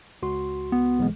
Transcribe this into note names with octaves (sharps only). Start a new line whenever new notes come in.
C#2 F#4 C6
B3
B1 E3 G#3